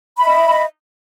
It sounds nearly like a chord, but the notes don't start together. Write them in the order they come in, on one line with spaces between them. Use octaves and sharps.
B5 E5 D#5